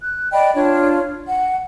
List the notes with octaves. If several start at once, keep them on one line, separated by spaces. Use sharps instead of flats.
F#6
D5 D#5 G5 B5
D4 F4 C#5
F#5